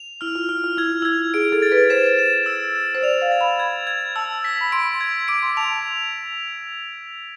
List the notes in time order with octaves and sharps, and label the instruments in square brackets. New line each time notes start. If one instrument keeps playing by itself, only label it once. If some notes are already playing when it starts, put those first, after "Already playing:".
Already playing: [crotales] F7
[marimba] E4 [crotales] F6
[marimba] F4
[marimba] F4 [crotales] F6
[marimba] F4
[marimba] E4 [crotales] G#6
[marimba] F4
[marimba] E4 [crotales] G#6
[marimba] G#4 [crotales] D7
[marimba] A4
[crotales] A6
[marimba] B4
[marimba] C5 [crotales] E7
[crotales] E7
E6
E7
[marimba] C5
[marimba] D5 [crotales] F7
[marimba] F5
[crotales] A6
[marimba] B5
[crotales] G#6
G#6
[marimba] A5 [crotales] E6
[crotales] B6
[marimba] B5
[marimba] C6 [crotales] D7
[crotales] G#6
[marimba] D6 [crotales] D7
[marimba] C6
[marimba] A5 [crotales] F7